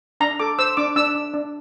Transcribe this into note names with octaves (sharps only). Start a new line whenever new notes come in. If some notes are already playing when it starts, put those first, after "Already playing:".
D4 A#5
A4 D6
C5 E6
D4 D6
D4 E6
D4
D4